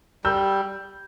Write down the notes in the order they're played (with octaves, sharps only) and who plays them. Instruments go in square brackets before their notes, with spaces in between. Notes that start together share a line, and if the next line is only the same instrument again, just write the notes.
[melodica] G3 [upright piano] E6 G6